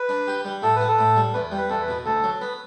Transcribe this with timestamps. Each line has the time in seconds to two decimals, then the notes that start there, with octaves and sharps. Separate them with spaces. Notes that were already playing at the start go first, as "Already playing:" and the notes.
Already playing: B4
0.09 D4
0.28 G4
0.45 G3
0.62 A2 A4
0.76 B4
0.81 B3
0.88 A4
0.99 A2
1.16 G3
1.34 E2 B4
1.52 G3
1.58 B4
1.70 E2 A4
1.82 B4
1.88 B2
2.05 D2 A4
2.24 F#3
2.41 B3 B4